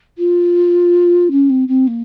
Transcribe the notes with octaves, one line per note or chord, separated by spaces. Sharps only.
F4
C#4
C4
C4
A#3